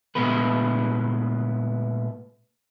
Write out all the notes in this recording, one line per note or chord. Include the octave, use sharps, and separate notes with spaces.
A#2 G#3 A3 B3 B4